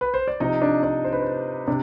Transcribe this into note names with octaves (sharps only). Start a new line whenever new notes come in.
B4
C5
D5
C3 F3 D#4 D#5
D4 D5
D4 D5
C5
B4
C5
C3 D4 D5